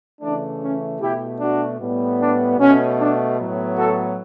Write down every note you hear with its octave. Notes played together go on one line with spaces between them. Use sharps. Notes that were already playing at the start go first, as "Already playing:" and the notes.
C#3 E3 A3 D4
C#4
B2 A3 E4 G4
D4 F#4
A2 G3 B3
D4
B2 A3 C#4
D4
A2 F#3 B3
F#4 A4